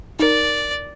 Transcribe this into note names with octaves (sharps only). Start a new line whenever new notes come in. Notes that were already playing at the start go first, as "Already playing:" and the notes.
D#4 A#4 D5